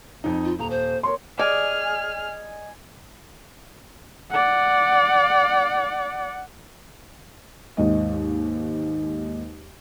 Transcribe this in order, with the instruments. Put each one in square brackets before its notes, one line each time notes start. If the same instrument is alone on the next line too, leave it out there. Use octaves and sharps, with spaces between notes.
[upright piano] F2 D#4
[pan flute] F4
[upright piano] D#1 [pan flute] A#5
[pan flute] C5
[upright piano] A#4 C#5 C6
[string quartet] G#4 F6 [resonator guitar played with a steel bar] D5 [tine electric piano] D#5 [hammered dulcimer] G#5
[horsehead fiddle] D5 F#5
[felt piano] D#2 G#2 D#5